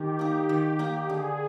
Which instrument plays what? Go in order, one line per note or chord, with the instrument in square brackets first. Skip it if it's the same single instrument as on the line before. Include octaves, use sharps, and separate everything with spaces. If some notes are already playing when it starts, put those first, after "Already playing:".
Already playing: [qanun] D#3 [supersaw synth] G4
[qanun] A#3 D#4
D#3
A#3 D#4
[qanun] D3 [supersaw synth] G#4